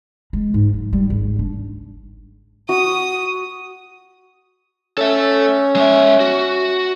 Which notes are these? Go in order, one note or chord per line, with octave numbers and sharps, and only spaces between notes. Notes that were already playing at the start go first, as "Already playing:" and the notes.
G#3
G#2
F#3
G3
G#1
D4
F#4 D#6
C#4 A4 E5
G#3 E5
F#4